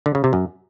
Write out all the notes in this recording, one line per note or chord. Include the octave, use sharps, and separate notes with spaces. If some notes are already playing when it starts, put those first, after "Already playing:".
D3
C#3
C3
F#2